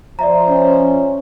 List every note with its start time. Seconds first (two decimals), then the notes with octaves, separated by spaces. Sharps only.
0.19 F3 C5 D5 E5 A#5
0.49 C#4